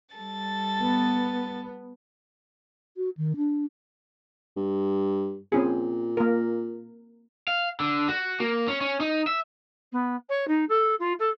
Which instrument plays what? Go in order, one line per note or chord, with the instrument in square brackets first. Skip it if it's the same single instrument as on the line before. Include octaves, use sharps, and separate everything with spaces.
[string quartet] G3 A4 A6
[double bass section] B3
[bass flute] F#4
D#3
D4
[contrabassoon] G2
[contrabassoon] A#2 [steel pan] C4 C#4 G#4
[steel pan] A#3 A#4
[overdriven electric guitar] F5
D3
F#4
A#3
C#4
C#4
D#4
E5
[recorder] B3
C#5
D#4
A4
F4
A4